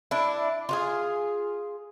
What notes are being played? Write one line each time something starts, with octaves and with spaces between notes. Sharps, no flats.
D4 E4
F4 F#4 G#4